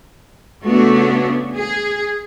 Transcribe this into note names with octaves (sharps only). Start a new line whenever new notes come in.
C#3 A3 B3 D4 F#4
G#4